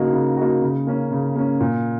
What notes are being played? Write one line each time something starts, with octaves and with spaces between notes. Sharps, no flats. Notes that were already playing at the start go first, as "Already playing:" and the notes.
Already playing: C#3 A#3 D#4 F#4
C#3
A#3 D#4 F#4
C#3
A#3 C#4
C#3
A#3 C#4
A#2